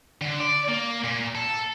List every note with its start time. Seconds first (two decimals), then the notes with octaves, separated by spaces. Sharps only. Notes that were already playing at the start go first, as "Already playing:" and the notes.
0.21 D3
0.41 D5
0.69 A#3
1.05 A#2
1.35 A4